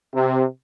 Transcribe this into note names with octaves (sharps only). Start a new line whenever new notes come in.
C3